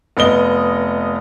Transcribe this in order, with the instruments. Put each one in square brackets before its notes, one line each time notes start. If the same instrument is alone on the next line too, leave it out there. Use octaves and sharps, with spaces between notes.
[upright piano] F1 B3 D#5 G7